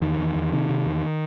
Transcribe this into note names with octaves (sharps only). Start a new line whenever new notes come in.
E2 D#3
E2
E2
C3 D#3
C3
E2